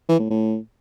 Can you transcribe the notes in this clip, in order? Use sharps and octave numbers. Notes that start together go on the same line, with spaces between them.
E3
A2
A2